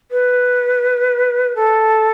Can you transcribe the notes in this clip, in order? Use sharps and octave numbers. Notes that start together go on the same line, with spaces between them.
B4
A4